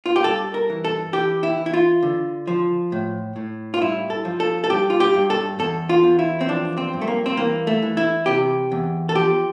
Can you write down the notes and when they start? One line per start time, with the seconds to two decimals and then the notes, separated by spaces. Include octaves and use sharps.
0.06 F4
0.16 G4
0.24 G2 A4
0.54 A#4
0.70 E3
0.85 A4
1.13 E3 G4
1.43 E4
1.58 E3
1.66 E4
1.74 F4
2.03 D3
2.47 F3
2.92 A2
3.36 A2
3.74 F4
3.81 G2 E4
4.10 A4
4.25 F3
4.40 A4
4.64 A4
4.69 G2 G4
4.90 F4
5.00 G4
5.14 G2
5.30 A4
5.59 E2 A4
5.89 F4
6.03 E2
6.19 E4
6.41 C4
6.48 F3 D4
6.77 C4
6.93 G2
7.01 A3
7.07 A#3
7.26 C4
7.37 E3 A#3
7.67 A3
7.82 E3
7.97 E4
8.26 C3 G4
8.72 E2
9.09 A4
9.15 F3 G4